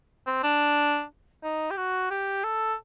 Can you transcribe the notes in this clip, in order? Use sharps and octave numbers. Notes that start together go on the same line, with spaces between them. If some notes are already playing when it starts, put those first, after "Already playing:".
C4
D4
D#4
G4
F#4
G4
A4